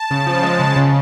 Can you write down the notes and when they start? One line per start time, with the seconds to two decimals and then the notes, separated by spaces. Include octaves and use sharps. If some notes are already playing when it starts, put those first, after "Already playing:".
Already playing: A5
0.11 C#3
0.26 F3
0.43 G#3
0.59 C#3
0.76 C#3